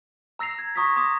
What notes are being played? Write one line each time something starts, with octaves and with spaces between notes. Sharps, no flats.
A#5 E6 A#6 C7 F7
G#6
A#5 C#6 D#6 E6 A#6 B6
A#5 C6 D6 D#6 A#6